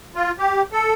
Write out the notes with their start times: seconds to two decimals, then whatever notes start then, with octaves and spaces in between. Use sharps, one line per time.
0.15 F4
0.39 G4
0.72 A4